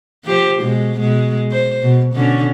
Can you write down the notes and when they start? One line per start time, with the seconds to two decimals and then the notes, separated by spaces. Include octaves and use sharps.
0.25 F3 G4 C5
0.61 B2 G#3
0.98 B2 G#3
1.51 C5
1.83 B2
2.14 B2 D3 C#4